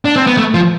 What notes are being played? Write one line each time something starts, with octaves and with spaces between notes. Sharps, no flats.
D4
C4
B3
A3
F3